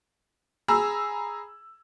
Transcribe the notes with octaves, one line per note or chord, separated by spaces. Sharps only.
G#4 A#5 B5 E6